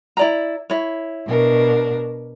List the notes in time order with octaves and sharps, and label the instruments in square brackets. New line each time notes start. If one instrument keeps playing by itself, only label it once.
[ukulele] E4 D5 A#5
E4 C#5
[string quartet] B2 D4 A#4